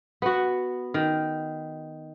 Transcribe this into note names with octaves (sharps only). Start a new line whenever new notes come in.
B3 F#4
D#3